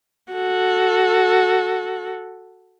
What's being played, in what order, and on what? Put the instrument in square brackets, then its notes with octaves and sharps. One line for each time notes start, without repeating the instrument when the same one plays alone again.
[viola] F#4 A4